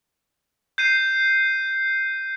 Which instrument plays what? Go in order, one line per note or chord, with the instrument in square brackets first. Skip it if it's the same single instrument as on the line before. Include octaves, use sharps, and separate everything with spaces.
[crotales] G6 C7 D#7